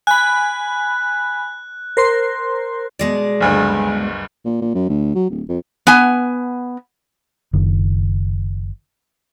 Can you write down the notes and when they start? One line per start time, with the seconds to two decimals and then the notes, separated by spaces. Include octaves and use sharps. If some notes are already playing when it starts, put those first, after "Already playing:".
0.07 G#5 B5 F#6
1.97 A#4 C5 C6
2.99 B2 G#3 D5
3.41 F#1 D2 G2
4.45 A#2
4.61 A#2
4.74 F#2
4.89 D2
5.15 F#3
5.30 D1
5.49 F2
5.87 B3 G#5
7.53 F#1 D#3